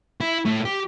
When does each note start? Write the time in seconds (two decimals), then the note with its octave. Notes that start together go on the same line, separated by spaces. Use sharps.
0.21 E4
0.46 A2
0.65 G4